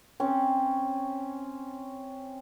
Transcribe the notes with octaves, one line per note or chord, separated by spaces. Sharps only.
C4 C#4